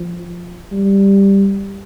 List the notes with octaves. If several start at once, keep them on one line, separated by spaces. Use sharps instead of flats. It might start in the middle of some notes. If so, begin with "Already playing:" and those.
Already playing: F3
G3